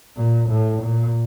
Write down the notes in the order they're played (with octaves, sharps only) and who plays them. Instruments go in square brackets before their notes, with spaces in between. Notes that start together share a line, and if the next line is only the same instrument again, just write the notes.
[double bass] A#2
A2
A#2